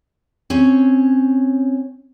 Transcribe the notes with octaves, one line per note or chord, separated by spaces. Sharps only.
C4 C#4 C#5